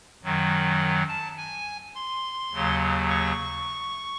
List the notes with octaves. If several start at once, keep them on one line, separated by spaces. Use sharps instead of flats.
F#2 D#3 F#3
A5
G#5
C6
D#2 C#3 F#3
C#6